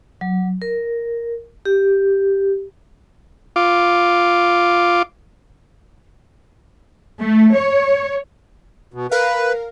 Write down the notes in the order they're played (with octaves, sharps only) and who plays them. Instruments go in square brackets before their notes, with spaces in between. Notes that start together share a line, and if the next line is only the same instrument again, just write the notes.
[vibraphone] F#3
A#4
G4
[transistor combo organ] F4 D6
[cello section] A3
C#5
[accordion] B2
[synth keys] A#4 F5 [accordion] B4